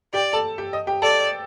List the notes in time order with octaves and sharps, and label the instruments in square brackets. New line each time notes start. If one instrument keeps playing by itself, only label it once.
[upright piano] G4 G5 [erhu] D5
[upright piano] A4 A5
G4 G5
D#5
G4 G5
[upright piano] A4 A5 [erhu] D5